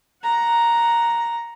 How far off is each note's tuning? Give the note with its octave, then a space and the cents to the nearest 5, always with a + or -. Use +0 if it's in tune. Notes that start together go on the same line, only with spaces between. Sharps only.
F#5 +0 A#5 +0